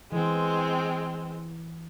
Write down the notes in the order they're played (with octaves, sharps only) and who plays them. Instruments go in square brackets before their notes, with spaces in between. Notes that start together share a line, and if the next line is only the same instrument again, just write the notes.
[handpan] E3 [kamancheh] G#3 C4